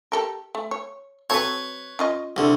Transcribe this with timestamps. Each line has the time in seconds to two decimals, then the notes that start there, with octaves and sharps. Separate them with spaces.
0.12 G4 A4 A#4
0.55 A3
0.71 C#5
1.30 F#3 C4 A4 B4 C#5
1.99 C#4 F4 D#5
2.37 C2 D3